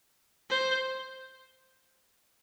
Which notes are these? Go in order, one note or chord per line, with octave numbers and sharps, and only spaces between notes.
C5